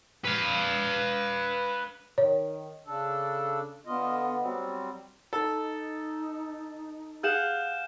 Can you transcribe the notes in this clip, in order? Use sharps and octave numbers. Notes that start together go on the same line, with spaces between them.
B4 F5
D#3 C#5
C#3 D4 A4
D3 B3 F4 D#5
F#3 G3 C4
D#4 A4
G#4 F5 F#5 F6 G6 E7